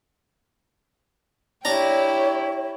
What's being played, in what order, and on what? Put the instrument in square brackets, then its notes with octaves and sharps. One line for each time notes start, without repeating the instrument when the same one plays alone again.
[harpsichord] D4 A#5 [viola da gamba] E4 G4 [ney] C#5